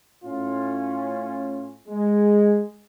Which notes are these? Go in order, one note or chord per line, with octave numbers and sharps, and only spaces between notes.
A2 C#4 F4
G#3